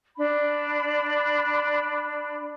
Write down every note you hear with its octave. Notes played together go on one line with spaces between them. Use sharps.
D4 B5